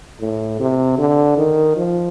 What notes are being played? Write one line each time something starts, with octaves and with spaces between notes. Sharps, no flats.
A2
C3
D3
D#3
F3